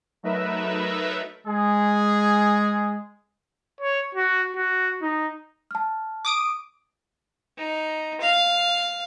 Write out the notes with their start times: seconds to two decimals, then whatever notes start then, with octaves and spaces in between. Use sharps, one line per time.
0.23 F#3 A3 D#4 A#4 B4 E5
1.47 G#3 G#4
3.81 C#5
4.15 F#4
4.56 F#4
5.02 D#4
5.71 A5 F6
6.25 D6 D#6 D7
7.58 D#4
8.21 F5